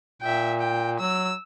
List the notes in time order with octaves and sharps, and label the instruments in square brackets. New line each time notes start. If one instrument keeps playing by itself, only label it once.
[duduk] A#2 [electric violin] E5 G5
[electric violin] G5
[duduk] F#3 [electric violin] E6